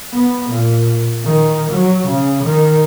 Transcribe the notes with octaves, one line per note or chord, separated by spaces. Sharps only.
B3
A#2
D#3
F#3
C#3
D#3